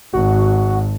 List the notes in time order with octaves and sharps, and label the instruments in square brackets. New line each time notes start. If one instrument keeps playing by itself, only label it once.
[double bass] G#1 [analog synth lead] F#4